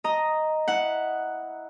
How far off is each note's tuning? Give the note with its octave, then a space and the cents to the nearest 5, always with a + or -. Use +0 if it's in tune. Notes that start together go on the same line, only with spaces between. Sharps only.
D#5 +0 A#5 +0
E4 -10 F#5 +0